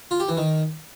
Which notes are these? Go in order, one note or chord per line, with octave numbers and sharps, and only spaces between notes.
F4
G4
E3
D#3